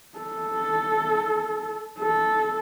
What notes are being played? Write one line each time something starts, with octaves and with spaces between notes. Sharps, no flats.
A4
A4